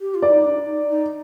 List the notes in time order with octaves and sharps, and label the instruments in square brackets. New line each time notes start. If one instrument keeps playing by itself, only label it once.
[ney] G4
F4
[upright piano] D5
[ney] D#4
D4
D#4
D#4